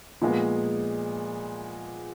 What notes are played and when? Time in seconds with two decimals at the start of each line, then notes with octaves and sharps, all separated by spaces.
0.22 A#2 F3 G#3 B3